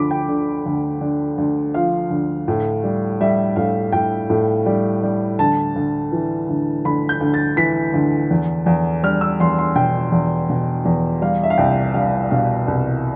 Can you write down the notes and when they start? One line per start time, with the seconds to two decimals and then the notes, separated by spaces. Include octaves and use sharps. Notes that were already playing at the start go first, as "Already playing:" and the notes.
Already playing: D2 F3 B5 D6
0.11 G5
0.29 D3
0.66 D2
1.01 D3
1.38 D2
1.74 F3 F5
2.11 D2
2.48 A2
2.84 G3
3.21 G3 E5
3.56 A2 F5
3.92 A2 G5
4.30 A2
4.66 G3
5.03 G3
5.39 D2 A5
5.76 D2
6.12 E3
6.49 D2
6.85 D2 B5
7.09 G6
7.21 D2
7.34 A6
7.57 E3 B6
7.94 D2
8.31 E2
8.66 E2
9.03 G3 F6
9.21 E6
9.40 E2 C6
9.58 C6
9.75 B2 G5
10.12 E2
10.50 B2
10.85 E2
11.22 G3 F5
11.43 E5
11.50 F5
11.58 C2 G5
11.94 G3 F5
12.31 B2 F5
12.68 C2